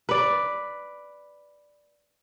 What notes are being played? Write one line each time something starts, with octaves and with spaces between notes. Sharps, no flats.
B4 D5